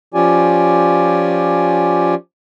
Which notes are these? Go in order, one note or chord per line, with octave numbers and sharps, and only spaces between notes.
F3 C#4 F4 G4 D5 G#5